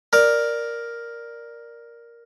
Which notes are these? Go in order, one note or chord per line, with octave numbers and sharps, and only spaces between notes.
A#4 D5